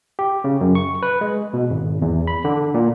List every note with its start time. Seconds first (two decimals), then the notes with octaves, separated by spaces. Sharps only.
0.19 G4
0.44 C#3
0.61 F#2
0.75 C#6
1.03 B4
1.21 G#3
1.53 B2
1.70 G#1
2.02 E2
2.27 B5
2.45 D3
2.74 A#2